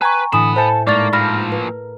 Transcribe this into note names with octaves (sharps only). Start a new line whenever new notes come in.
B4 G5 G#5 A#5 C#6
A2 D3 E3 B3 G#5 B5 D#6 E7
A4 C5 E5 G#5 A5 G6 C#7
G#2 A3 A#3 B4 D5 C#6 A6
A#2 F3 B5 F6 A#6
A#4 B4